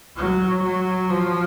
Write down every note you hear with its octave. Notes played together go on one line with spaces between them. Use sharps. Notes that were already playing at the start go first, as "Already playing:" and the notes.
F#3
F#3
F3